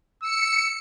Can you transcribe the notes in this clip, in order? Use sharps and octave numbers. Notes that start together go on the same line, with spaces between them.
E6 C#7